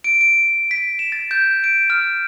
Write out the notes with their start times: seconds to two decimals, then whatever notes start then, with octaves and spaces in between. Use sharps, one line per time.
0.04 D7
0.21 D7
0.71 B6
0.99 E7
1.12 A6
1.31 G6
1.64 D7
1.90 F6